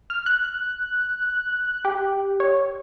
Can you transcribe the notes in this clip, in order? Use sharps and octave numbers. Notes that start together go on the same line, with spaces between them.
F6
F#6
G4
C#5